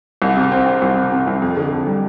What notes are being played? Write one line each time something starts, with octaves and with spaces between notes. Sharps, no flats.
C2
C3
C4
C4
C2
C3
C3
C2
F2
D3
F2
G3